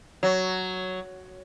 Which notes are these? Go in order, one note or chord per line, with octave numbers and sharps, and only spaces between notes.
F#3